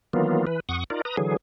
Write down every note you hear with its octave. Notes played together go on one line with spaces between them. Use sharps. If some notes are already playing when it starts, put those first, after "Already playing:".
D#3 E3 F#3 A#3 B3 F4
E3 B4
F2 F#5 C#6 D#6
D#4 F4 A#4 D5
B4 A#5 D#6
D3 E3 F#3 G#4